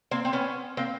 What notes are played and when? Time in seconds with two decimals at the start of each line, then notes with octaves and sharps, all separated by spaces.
0.11 A#3 C4
0.25 C4
0.33 B3 C#4
0.77 A#3 C4